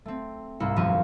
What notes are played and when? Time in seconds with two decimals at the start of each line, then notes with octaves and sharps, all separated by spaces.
0.06 A3 C4
0.60 C2 G#2 A#3 E4 E6 C#7
0.76 D#1 F#2 F3 C#6 D#7